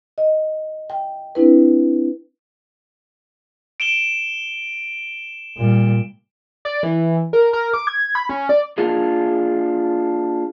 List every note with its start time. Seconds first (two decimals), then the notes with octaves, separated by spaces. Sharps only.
0.18 D#5
0.90 G5
1.35 C4 D4 E4 B4
3.80 D7 E7 G7
5.56 A#2 G3
6.65 D5
6.83 E3
7.33 A#4
7.53 A#4
7.73 D6
7.87 G#6
8.15 B5
8.29 C#4
8.49 D5
8.78 A#3 D4 D#4 F4 F#4 G#4